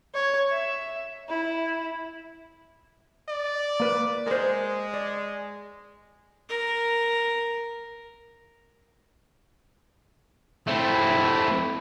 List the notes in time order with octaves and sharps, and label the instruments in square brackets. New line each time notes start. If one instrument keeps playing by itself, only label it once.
[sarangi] C#5
E5
E4
[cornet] D5
[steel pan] A#3 B4
[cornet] G#3 [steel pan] A#4 C5
[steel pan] D5
[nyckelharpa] A#4
[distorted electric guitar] A3 C4 [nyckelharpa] E4